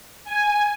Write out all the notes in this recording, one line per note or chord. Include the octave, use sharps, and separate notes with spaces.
G#5